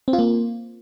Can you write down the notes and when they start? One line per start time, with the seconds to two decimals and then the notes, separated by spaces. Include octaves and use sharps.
0.08 C4
0.13 F4
0.19 A#3